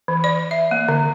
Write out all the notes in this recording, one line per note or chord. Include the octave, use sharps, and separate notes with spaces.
E3
D5
E5
A#3
D3